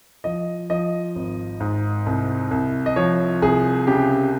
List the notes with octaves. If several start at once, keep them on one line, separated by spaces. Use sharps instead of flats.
F3 D#5
F3 D#5
G#1
G#2
C2
C2
D#5
F3 C#5
C2 G#4
C#3 G4